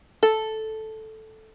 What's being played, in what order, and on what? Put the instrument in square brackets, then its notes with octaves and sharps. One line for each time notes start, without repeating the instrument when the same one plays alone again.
[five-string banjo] A4